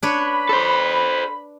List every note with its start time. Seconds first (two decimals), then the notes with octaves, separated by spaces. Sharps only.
0.03 D4 B4 C#5
0.21 B5
0.49 A4 C5